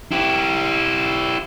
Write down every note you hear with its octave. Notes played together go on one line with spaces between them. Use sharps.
E4 G4